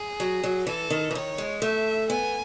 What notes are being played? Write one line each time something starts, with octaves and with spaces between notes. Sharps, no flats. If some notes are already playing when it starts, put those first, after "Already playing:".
Already playing: G#4
F#3
F#3
E3 A4
D#3
E3
D#3 C#5
G#3
A3 E5
B3 G#5